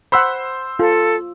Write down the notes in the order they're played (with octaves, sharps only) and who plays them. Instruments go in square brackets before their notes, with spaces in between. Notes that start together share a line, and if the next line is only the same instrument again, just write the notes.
[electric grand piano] C5 C6 E6 [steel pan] F#5 B5
[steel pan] F4 [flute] A4